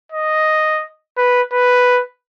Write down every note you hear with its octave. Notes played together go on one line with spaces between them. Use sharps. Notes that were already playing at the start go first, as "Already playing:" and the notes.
D#5
B4
B4